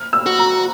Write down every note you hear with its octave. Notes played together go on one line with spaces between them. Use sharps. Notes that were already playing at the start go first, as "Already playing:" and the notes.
Already playing: F6
E6
F#4
A#5